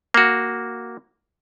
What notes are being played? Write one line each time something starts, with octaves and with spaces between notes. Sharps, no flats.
A#3 F#4